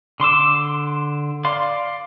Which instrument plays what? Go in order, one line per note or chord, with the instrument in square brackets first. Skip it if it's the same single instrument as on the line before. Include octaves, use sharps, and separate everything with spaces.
[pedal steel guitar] D3 C6 D6 E6
D5 F5 C6